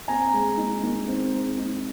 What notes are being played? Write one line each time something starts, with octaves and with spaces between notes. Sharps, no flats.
C4 G#5 A#5
G#3
D#4
D#3
C4
G#3
D#4